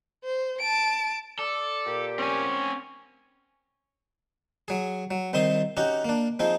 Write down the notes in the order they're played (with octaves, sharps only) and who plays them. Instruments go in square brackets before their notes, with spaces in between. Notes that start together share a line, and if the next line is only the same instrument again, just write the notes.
[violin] C5
A5 D7
[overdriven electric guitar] A4 [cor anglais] D5
[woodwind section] A#2 G4
[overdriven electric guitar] C4 G#5 [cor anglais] C#4
[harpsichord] F#3 G#4
F#3
C2 D#3 C4 C5 C6 D#6
C#4 D#4 F#4 G4
A#3 D4
F3 C4 D#4 G#4